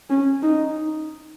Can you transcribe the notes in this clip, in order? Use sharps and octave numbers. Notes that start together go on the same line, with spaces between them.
C#4
D#4